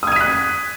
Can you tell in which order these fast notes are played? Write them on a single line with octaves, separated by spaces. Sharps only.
D#6 G#6 D#7 B6 F#6